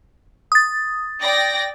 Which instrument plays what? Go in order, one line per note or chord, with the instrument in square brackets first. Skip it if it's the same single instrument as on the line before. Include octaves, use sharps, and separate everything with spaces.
[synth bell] D#6 A6
[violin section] D5 G5 A#6